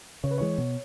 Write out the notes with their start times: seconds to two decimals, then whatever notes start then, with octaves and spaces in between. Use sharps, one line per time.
0.24 C#3 C#5
0.31 B4
0.38 E3 G#3 C#5
0.58 B2